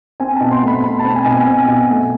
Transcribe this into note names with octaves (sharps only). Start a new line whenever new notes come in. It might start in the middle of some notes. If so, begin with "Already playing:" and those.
C4 G#5
B2 A5
C6
A3 B5
B2 B5
C4 A5
G#5
B2 G#5
C4
B2
A3